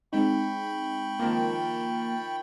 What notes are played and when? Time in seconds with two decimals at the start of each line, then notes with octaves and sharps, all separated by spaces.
0.13 G#3 C4 D#4 G5 B5 C#6
1.19 D#3 F3 A#3